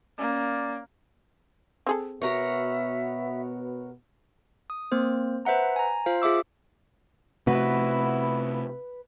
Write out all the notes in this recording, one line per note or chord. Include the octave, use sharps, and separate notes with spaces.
A#3 C#4 D5
C4 G#4 A4
B2 B3 F#4 A#4 C#5 E5
D#6
A#3 C4 C5
B4 C5 E5 F#5 A#5
G#5 A#5
F4 C5 F5
F4 G#4 E5 D6 E6
C3 A3 B3 E4 F#4 B4